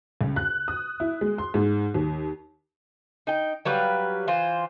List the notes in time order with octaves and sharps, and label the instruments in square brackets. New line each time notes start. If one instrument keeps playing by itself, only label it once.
[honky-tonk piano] C#2
F#6
D#6
E4
G#3
C6
G#2
D#2
[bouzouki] D#4 G5
F#3 G3 B4 F5
E3 F4 C5